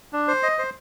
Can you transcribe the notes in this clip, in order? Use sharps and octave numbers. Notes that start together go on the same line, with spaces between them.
D4
C5
D#5
C5